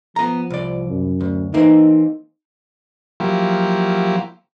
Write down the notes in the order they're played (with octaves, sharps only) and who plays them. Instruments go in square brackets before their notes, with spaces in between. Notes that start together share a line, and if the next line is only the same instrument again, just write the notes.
[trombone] F3 [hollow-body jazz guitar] B3 A#5
[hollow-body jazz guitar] C2 D5
[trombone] F#2
[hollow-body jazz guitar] D2
[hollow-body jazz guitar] E3 A#3 C4 [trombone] D#4
[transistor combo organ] F3 F#3 A#3 E4 G4